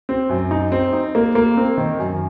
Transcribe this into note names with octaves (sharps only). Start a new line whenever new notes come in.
C4
F#2
D#4
C4
D#4
A#3
A#3
C4
D#3
F#2